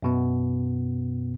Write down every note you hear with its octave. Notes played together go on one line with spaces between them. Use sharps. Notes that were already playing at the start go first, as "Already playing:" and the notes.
F#2 B2 B3